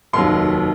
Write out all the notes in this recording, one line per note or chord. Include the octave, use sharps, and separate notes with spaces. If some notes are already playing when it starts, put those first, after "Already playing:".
F1 D#2 D#3 F#3 C6